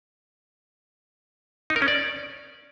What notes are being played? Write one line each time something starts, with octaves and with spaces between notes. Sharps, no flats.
D#4
A#4
C#4
D5